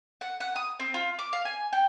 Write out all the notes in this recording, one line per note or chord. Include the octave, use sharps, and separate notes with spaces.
F#5
F#5
D#6
C4
F4
D6
F5
G#5
G5